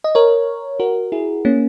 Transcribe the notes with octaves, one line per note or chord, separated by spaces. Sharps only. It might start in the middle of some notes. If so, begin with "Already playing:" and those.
D#5
A#4 C#5
F#4 A#4
E4 G#4
A#3 C#4